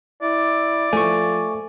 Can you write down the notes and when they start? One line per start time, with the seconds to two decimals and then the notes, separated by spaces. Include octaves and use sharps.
0.22 E4 D5
0.93 F3 A3 G#5 C#6